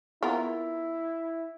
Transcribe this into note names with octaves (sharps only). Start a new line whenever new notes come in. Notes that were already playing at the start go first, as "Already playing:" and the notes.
B3 E4 F4 A#4